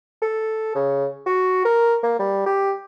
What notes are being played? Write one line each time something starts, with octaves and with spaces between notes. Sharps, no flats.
A4
C#3
F#4
A#4
A#3
G3
G4